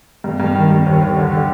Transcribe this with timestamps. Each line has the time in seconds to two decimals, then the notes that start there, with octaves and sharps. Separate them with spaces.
0.24 G2
0.40 G2
0.55 D#3
0.70 G2
0.86 D#2
1.01 D#2
1.16 D3
1.32 D3